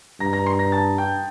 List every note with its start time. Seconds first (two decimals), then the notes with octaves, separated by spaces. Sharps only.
0.20 G2 A#5 A#6
0.33 A#5 A#6
0.46 C6 C7
0.59 A#5 A#6
0.72 A5 A6
0.98 G5 G6